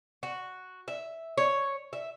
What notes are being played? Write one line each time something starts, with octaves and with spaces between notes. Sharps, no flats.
F#4
E5
C#5
E5